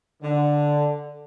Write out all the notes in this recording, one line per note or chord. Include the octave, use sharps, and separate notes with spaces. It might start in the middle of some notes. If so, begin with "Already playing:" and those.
D3